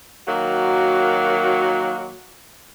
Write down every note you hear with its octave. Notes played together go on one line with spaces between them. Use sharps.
D#3 F#3 A#3 F#4